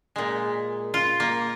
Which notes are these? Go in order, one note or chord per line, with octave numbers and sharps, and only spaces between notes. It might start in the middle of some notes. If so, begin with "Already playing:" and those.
A#2 G#3
F4
A#3